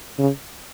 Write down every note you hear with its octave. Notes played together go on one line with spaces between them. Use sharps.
C#3